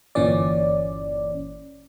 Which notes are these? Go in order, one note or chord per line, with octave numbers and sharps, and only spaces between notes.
G1 A#2 E3 C#4 D5